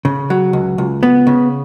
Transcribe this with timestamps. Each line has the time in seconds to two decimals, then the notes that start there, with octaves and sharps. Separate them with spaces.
0.05 C#3
0.30 F#3
0.53 C#2
0.78 C#2
1.03 B3
1.27 C#3